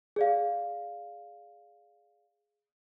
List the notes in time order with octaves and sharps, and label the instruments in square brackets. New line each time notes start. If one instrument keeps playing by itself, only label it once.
[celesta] G#4 D5 F5